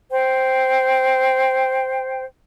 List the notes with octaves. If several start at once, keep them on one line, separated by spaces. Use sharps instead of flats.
C5 G5